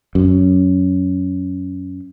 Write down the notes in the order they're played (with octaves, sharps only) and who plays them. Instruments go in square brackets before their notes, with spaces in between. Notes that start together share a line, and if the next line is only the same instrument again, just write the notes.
[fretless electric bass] F#2